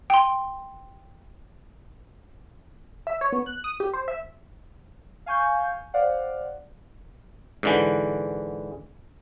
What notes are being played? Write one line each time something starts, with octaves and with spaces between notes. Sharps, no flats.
G5 C6
E5
C#5
B3
F#6
D#6
G4
C5
E5
F5 G#5 C#6 G6
C5 D5 F5 F#5
G#2 D3 E3